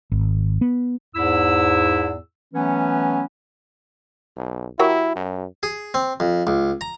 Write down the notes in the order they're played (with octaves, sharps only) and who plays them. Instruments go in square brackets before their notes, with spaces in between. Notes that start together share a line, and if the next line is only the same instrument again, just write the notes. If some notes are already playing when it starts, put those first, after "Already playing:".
[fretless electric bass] G#1
B3
[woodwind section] E2 G#2 E4 E6
E3 F#3 A3 B3 C#4
[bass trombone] B1
[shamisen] F#3 G4 A#4 [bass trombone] E4
[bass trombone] F#2
[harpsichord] G#4
C4
F2
C#2
A#5